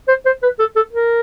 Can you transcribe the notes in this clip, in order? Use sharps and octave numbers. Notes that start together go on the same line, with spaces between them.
C5
C5
B4
A4
A4
A#4